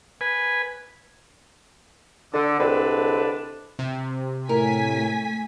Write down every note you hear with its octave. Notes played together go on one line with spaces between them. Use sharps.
B4 G#5
D3
C2 D3 G#3 C4 D4 B4
C3
A2 A3 A#4 G#5 B6